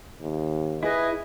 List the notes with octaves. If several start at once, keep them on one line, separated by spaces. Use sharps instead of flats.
D#2
E4 G#4 B4 D#5